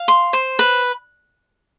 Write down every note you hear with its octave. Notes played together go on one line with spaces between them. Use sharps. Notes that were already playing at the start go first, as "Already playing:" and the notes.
Already playing: F5
C6
C5
B4